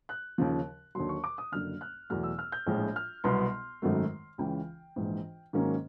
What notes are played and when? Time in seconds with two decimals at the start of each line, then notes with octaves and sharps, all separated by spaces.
0.09 F#6
0.38 D#2 C#3 F3
0.95 D#2 D3 F#3 C6
1.09 C#6
1.24 D6
1.38 D#6
1.52 F#1 F#2 D3 F6
1.81 F#6
2.10 E2 B2 F#3 A3 F6
2.23 E6
2.39 F6
2.52 G6
2.66 A#1 A2 F3 G#3
2.96 F6
3.24 C2 B2 F#3 B3 C6
3.82 G#1 F#2 D#3 F#3 A3
4.38 C#2 C#3 E3 G5
4.96 A#1 G#2 E3
5.53 G#2 D#3 F#3 A#3 C#4